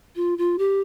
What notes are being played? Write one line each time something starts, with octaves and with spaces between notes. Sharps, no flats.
F4
F4
G4